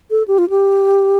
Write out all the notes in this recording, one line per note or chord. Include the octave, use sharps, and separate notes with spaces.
A4
G4
F4
G4